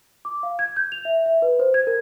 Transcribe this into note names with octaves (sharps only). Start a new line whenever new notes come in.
D6
F5
G#6
G6
F7
E5
E5
B4
C5
G#6
A#4